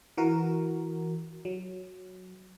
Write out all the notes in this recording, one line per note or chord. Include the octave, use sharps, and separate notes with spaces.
E3 F#4 A#4
F#3